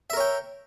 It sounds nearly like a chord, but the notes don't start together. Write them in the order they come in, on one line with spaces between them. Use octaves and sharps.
E5 A#4 C#5 G5